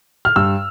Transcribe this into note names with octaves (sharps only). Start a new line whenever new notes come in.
F6
G2 E6